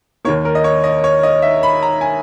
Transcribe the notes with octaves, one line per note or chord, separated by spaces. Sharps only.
D#2 D#3 A#3 C#5
A#4
D#5
C#5
D#5
C#5
D#5
E5
B5
A#5
G#5